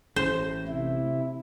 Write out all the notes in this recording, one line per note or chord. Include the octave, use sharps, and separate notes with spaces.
A1 A2 C5
C3 E4